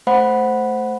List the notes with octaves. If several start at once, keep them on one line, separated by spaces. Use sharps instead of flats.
A3 C5 F#5 B5